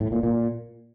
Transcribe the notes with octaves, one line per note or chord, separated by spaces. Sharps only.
A2
A#2
A#2